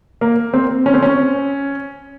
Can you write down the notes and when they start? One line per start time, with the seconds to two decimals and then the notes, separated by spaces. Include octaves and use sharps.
0.21 A#3
0.54 C4
0.86 C#4
0.94 C4
1.02 C#4